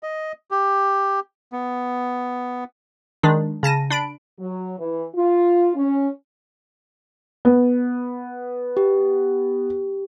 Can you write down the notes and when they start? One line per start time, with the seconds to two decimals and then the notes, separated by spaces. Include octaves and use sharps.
0.03 D#5
0.51 G4
1.53 B3
3.23 D#3 G#3 D4
3.63 C#3 A5 A#6 D#7
3.90 D4 B5 D7
4.39 F#3
4.79 E3
5.15 F4
5.76 C#4
7.45 B3
8.77 G4